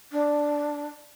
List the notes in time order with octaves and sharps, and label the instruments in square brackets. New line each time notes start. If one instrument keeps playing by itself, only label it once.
[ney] D4